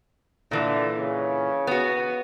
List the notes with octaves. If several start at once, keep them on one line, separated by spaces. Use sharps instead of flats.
A#2 D3 E3
C#3
B3 F#4